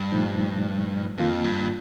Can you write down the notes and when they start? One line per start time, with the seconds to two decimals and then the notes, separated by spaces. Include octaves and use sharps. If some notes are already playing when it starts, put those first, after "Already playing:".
Already playing: G2
0.12 A#2 F3 A3 D#4
1.18 F2 D#3 A#3 F4
1.44 G2